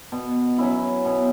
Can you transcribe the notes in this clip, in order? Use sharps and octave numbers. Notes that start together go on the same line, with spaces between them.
B2
F#3 C#4 E4
B2